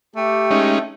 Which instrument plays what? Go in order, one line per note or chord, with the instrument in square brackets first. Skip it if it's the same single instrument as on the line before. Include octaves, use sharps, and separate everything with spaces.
[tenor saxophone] A3 [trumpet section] G4
[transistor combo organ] G#3 C#4 D#4